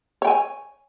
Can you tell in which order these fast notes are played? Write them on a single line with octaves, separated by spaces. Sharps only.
C#5 G5 G#5